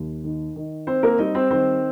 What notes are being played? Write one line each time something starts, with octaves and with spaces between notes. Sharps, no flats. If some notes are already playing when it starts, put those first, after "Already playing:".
Already playing: D#2
D#3
D#3
C4 C5
A#3 A#4
G3 D#4 D#5
C4 C5
D#3 C4 C5